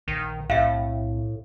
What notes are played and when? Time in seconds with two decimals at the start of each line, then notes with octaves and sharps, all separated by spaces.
0.08 A#1 D#3
0.50 B1 A2 C4 E5 F5